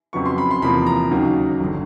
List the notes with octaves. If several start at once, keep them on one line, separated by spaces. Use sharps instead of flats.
F2 C#3 F#3 B3 C#6
C6
B5
C6
E2 C3 F3 A#3 B5
A#5
D#2 C#3 F#3
G1 D3